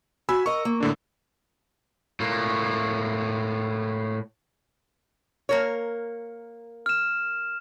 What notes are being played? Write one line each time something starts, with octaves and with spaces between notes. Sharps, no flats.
F#4 G#5 B5 E6
A#4 D#5 C#6
A#3
A2 D3 D4
A2 A#3
A#3 A#4 C#5
F6 E7